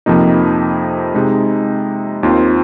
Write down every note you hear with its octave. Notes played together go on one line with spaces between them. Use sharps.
F2 C3 F3 A#3 D#4
C3 G#3 D#4
D#2 D#3 C4 F4